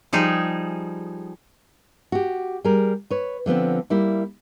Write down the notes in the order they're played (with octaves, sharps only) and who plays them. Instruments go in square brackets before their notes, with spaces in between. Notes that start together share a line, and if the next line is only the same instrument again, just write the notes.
[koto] F3 G3 D#4 G#4
[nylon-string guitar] F#4 G4
G3 G#4 A#4
B4 C#5
D3 F3 B3 C4
G3 A#3 E4